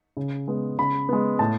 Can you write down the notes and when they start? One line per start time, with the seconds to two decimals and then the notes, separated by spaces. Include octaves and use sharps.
0.17 C#3
0.48 G#3 B3
0.78 C#3 B5
1.09 G#3 B3
1.39 A2 A5